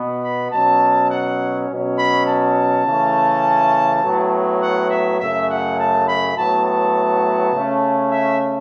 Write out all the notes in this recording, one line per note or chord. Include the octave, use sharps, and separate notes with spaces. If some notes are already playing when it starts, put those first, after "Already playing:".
Already playing: B2 B3
B5
B2 F#3 C#4 A5
F#5
B2 F#3 C#4
B5
A5
C#3 E3 A3 C#4
A2 F#3 B3
F#5
E5
F#2 C#3 A3 E5
F#5
A5
B5
A2 F#3 B3 A5
A5
C#3 A3 C#4
E5